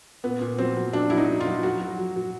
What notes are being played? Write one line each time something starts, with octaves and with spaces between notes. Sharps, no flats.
A#2 B3
A#2
F#3 C4
F#3
F#3 D4
F#3 E4
D#4
F#3
F4
F#3
F#3 F#4
F#3
F#3
F#3